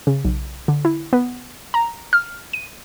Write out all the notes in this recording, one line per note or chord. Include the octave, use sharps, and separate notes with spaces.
C#3
B1
D3
E4
B3
A#5
F6
D#7